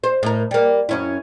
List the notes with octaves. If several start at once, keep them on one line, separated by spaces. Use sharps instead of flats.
C5
A2 A#4
G3 A#3
F#2 C#4 E4